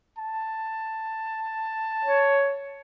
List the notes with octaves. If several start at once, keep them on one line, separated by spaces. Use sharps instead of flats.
A5
C#5